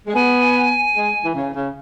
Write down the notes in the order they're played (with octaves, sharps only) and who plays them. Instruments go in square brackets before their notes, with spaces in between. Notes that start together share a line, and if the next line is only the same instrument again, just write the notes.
[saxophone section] G#3
[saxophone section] B3 [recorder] G#5
[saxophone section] G#3
E3
C#3
C#3